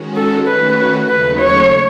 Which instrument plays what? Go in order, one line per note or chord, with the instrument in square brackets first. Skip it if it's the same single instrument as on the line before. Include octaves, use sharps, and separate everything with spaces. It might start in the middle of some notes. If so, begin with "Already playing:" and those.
Already playing: [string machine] D#3 G#3 C#4 F#4
[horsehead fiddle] A4
[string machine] D#3 A3 C#4 F#4 [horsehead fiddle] B4
[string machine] D#2 C#3 F#3 A3 D#4 [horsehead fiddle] B4
[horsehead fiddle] C#5